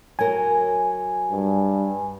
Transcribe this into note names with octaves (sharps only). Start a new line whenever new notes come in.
F#3 A#4 G#5
G2